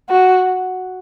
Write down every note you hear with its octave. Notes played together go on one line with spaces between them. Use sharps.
F#4